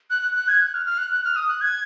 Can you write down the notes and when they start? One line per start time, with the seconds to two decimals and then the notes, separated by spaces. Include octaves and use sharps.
0.10 F#6
0.23 F#6
0.36 F#6
0.48 G#6
0.61 F#6
0.74 F6
0.86 F6
0.98 F#6
1.11 F#6
1.25 F6
1.36 D#6
1.49 F#6
1.61 G#6